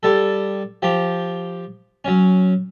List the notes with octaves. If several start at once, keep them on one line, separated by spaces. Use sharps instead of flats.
G3 A4
F3 G4
F#3 C#4